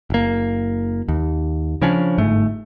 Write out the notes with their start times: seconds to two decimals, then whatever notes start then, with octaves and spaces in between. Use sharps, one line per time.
0.10 F#1 A#3
1.08 D#2
1.82 C#3 F3 C#4 D4
2.18 G1 G#2 A3